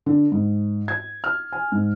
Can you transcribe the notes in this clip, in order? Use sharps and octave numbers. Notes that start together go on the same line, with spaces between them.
D3
G#2
G#6
F6
G#5
G#2